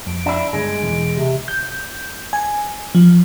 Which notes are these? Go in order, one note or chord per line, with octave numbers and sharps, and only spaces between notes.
F2 D7
D4 E4
G2 D3 G#3
E2 B2 E3
C3
G6
G#5
F3